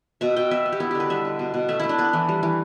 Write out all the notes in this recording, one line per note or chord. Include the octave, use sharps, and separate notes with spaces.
B2 E5
B2 G5
B3 E5
B3
G4
B3 E4
D3 G4
B4
G3 E5
D3
B2
B2
A3 E5
A3 E4
D4
B3 B4
E3
G3
E3